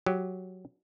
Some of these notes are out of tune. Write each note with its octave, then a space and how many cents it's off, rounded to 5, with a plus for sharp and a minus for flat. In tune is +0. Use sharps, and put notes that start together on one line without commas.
F#3 +0 G4 +0